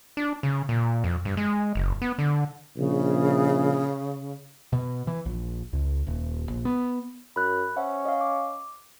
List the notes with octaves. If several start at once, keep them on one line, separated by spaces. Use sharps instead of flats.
D4
C#3
A#2
F2
G2
G#3
F#1
B3
D3
A#1 C#3
B2
E3
A#1
C#2
D#1
A#1
B3
F#2 B5 F#6
C#4 C5 E5 F#5
D#5 F5
D6